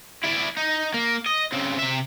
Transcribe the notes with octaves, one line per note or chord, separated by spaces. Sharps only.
E4 D5
D#4
A#3
D#5
C#3 C4
C3 E5